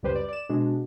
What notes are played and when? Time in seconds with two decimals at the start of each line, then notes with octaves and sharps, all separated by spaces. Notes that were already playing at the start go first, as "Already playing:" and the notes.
0.03 C#2 F#2 G3 G4 B4 C5
0.15 D5
0.28 D5 E7
0.49 B2 G#3 D4 F#4